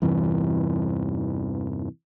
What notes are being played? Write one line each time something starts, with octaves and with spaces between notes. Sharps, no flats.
E2 G2 C3 E3